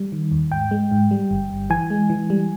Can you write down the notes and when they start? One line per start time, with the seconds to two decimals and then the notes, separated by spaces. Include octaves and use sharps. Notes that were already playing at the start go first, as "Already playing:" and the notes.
Already playing: G3
0.12 D#3
0.32 D#2
0.51 G#2 G5
0.71 G#3
0.91 G#2
1.11 G3
1.31 G1
1.50 G1
1.70 E3 G#5
1.90 G#3
2.10 E3
2.30 G3